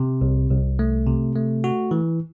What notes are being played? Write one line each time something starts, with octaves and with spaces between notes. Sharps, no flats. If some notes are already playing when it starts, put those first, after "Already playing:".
Already playing: C3
C2
C2
A3
C3
A3
F#4
E3